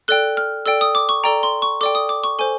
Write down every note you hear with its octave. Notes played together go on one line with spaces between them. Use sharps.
A4 D5 G5 F#6
F6
A4 D5 G5 E6
D#6
D6
C#6
A4 D5 G5 A#5
C6
C#6
A4 D5 G5 D6
D#6
D6
C#6
A4 C5 G#5